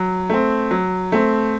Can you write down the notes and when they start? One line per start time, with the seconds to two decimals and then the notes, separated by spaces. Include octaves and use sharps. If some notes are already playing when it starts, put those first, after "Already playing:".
Already playing: F#3
0.30 A3 C4
0.71 F#3
1.12 A3 C4